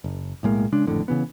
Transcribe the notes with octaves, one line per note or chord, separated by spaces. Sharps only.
F#1
B1 A2 G#3 A#3
C#3 G#3 D4
G#1 F2 A2 D3
C#3 E3 B3